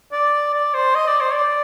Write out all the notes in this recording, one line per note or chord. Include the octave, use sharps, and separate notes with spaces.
D5
D5
C5
D#5
D5
C5
D5